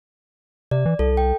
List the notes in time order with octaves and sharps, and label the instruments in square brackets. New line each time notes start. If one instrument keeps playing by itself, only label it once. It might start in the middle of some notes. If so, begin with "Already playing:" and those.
[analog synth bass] C3 [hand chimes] D5
[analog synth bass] E3
[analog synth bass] C2 [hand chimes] A4
[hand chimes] G5